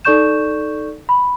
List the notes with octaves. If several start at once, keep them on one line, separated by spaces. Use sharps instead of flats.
D#4 A4 D5 C#6 G6 E7
B5